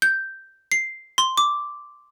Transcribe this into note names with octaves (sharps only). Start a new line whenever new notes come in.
G6
C7
C6
D6